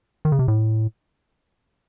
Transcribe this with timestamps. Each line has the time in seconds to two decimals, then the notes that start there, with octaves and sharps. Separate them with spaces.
0.25 D#3
0.32 C#3
0.39 C3
0.48 A2